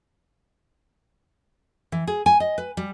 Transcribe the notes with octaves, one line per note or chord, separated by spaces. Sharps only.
E3
G#4
G#5
D#5
B4
G3